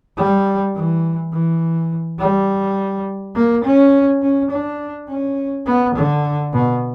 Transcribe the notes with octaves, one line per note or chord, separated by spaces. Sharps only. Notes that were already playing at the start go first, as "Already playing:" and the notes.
G3
E3
E3
G3
A#3
C#4
C#4
D4
C#4
B3
D3
B2